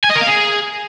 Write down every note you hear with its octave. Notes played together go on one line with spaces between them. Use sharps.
G#5
D#5
A#4
F5
G#4